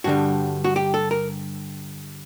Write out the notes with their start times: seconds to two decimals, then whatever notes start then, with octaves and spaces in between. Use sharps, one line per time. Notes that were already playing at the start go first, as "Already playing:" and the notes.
0.04 G2 D3 G3 F#4
0.64 F#4
0.76 G4
0.94 A4
1.11 A#4